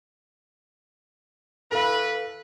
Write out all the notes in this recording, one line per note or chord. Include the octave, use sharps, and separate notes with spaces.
E3 A4 B4 F5